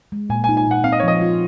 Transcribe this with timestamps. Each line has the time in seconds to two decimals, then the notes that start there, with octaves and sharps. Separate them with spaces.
0.12 G#3
0.30 A#2 G#5
0.44 G#5
0.49 D#4
0.57 G#5
0.66 A#2 F#5
0.84 C4 F5
0.92 D#5
1.00 C#5
1.03 F3 D#5
1.21 F4